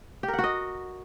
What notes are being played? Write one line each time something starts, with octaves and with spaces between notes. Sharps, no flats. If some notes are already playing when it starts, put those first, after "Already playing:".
G4
A#4
F#5
F#4
D#5